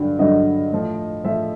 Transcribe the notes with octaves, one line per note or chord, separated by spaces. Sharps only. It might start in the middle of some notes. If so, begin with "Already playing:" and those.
Already playing: G2 D3 F#3
G2 D3 F#3 D#5
A2 F3
A2 F3 E5